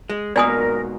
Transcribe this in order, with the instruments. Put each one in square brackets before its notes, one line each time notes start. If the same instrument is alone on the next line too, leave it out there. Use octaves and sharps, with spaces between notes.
[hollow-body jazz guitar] G#3
[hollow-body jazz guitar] G#2 B2 A#3 [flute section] A#4 [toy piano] D5 G#5 D#6